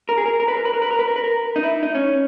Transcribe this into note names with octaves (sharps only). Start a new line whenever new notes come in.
A#4
G#4
A#4
A#4
B4
A#4
B4
A#4
B4
A#4
B4
A#4
B4
A#4
D#4
E4
D#4
C#4